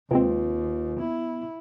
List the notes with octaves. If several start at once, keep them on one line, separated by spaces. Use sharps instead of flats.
D#2 C3 G#3 C4 F4 B4
B3 E4